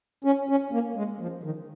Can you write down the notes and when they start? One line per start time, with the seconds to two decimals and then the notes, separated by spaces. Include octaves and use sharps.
0.24 C#4
0.49 C#4
0.72 A#3
0.96 G#3
1.20 F3
1.43 D#3